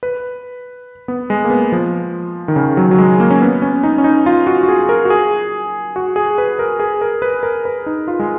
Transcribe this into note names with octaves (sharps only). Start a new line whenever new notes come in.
B4
B3
G#3
A#3
B3
F3
D#3
C#3
F#3
F#3
G#3
A#3
C#4
B3
C#4
D#4
C#4
D#4
F4
F#4
F#4
G#4
A#4
F#4
G#4
F#4
G#4
B4
A#4
G#4
A#4
B4
A#4
B4
D#4
F4
G#3